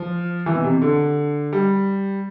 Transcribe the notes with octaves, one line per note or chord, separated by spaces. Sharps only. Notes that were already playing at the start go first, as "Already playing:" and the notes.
Already playing: F3
E3
B2
C3
D3
G3